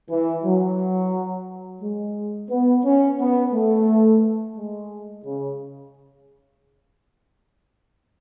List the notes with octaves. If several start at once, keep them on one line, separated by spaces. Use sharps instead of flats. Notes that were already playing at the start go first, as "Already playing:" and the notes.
E3
F#3
G#3
B3
C#4
B3
A3
G#3
C#3